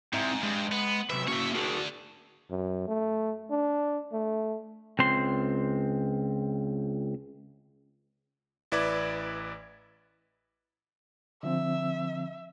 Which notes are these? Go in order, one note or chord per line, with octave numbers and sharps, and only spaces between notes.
G#2 C4 E4 E5
G2 G#3
B3
C3 F#3 B4 E5
A#3 C#4 F#4 C#5 E5
A3 D4 F#4 G#4 A#4
F#2
A3
D4
A3
C#2 C4 C6
A1 E4 B4 D5 D6 G#6
D3 F3 C4 E5